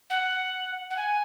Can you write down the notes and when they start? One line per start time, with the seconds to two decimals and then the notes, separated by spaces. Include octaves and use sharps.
0.10 F#5
0.90 F#5
0.97 G#5